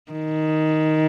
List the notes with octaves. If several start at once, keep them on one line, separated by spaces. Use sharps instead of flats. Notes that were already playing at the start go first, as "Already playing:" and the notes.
D#3